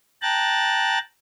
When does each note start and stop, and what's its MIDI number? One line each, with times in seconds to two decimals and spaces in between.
0.22 0.98 79
0.22 0.98 81
0.22 0.98 82
0.22 0.98 90
0.22 0.98 93